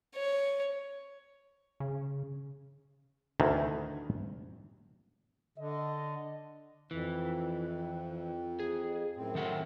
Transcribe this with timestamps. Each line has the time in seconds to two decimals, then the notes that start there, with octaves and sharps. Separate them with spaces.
0.15 C#5
1.80 C#3
3.40 D2 D#3 E3
5.58 D3 D#5
6.91 F2 E3
8.60 G#4
9.16 F#2 A2 C4
9.35 D#3 C5 F#5